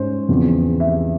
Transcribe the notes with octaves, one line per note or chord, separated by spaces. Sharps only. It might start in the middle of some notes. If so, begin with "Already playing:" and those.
Already playing: G#2 C#4 C5
E2 C#3 F3 C4
E5